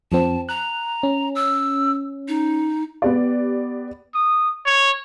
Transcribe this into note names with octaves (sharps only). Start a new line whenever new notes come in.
F2 F3 C4 A5
A#5 F#6
C#4
E6
D#4
B3 G4 D5
D#6
C#5